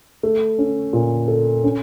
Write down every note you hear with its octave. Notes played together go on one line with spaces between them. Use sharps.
A3
C#4
A#2
A4
C#4